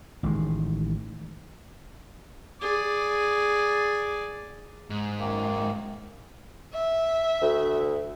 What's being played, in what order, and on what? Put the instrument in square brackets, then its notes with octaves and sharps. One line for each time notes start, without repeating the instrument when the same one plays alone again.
[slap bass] A1 D#3 G#3
[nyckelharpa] G#4 D5
[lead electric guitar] G#2
[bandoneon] F#2 D#3 A#3
[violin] E5
[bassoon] D2